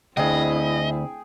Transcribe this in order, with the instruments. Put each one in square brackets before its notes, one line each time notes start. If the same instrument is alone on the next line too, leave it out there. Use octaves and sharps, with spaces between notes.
[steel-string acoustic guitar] D2 [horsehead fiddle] C4 E4 [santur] G#4 G5 [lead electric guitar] D#5